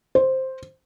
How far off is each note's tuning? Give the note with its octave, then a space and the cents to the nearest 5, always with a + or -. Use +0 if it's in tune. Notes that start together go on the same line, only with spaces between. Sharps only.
C5 +5